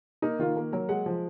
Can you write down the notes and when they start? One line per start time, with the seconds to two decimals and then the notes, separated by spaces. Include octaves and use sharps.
0.22 A#3 D#4
0.39 D#3 F4
0.56 A#3
0.73 F#3 A#4
0.89 G#3 F#5
1.06 F3